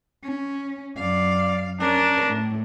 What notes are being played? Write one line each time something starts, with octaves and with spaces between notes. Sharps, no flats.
C#4
F#2 D5 F5
C#4 D4 A#4
A2